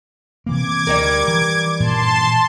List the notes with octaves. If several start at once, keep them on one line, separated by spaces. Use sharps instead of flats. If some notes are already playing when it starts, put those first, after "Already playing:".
C3 E3 A#3 D6 G#6
D2 G3 D#4 A#4
E3
G2 A#2 E3 A5 C6